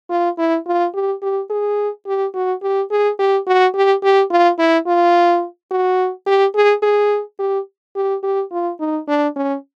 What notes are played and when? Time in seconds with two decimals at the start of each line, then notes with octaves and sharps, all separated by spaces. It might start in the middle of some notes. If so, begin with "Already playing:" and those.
0.10 F4
0.38 E4
0.67 F4
0.94 G4
1.22 G4
1.50 G#4
2.06 G4
2.34 F#4
2.62 G4
2.91 G#4
3.19 G4
3.47 F#4
3.74 G4
4.03 G4
4.31 F4
4.58 E4
4.87 F4
5.71 F#4
6.27 G4
6.55 G#4
6.82 G#4
7.39 G4
7.96 G4
8.23 G4
8.52 F4
8.80 D#4
9.08 D4
9.36 C#4